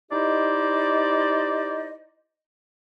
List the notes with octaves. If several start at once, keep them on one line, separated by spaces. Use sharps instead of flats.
D#4 E4 G4 C5 D5 D#5